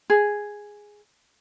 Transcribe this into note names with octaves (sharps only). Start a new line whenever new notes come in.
G#4